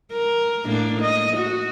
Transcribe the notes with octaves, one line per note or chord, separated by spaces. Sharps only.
A#4
A2 A#3 D4
D#5
F#4